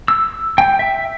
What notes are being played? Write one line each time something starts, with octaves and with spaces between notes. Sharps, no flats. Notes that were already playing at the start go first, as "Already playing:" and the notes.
E6
G5
E5